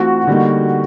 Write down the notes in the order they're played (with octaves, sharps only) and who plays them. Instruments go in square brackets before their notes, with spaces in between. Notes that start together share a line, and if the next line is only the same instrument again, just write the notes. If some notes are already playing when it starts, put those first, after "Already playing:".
Already playing: [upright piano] E3 A3 C4 F4 A4 [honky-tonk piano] F#4
[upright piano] D3 G3 A#3 D#4